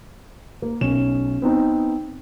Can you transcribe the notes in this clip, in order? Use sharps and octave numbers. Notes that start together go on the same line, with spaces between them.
A#3
B1 C#4 E7
B3 C4 D#4 B4